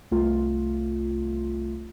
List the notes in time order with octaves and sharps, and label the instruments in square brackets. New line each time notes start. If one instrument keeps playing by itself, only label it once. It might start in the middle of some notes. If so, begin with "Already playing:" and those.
[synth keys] C2 A3 F4